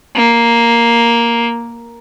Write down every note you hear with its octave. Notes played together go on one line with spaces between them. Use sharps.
A#3